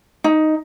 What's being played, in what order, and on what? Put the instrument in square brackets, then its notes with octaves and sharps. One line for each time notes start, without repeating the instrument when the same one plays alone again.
[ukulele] D#4